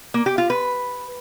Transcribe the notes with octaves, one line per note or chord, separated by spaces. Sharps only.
A#3
G4
F4
B4